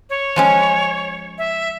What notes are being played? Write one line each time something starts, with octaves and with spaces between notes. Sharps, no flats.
C#5
F3 G#3 C#4
E5